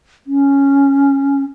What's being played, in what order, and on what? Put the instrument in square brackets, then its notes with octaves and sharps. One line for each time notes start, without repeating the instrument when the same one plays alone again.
[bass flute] C#4